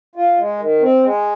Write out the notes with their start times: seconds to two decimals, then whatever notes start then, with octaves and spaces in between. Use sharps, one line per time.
0.16 F4
0.37 G#3
0.59 D#3
0.81 C4
1.03 G#3